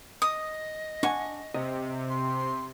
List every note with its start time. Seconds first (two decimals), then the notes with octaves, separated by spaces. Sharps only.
0.22 D#5 D#6
1.03 D4 F#5 G#5 C#6
1.54 C3 D#5
2.10 C6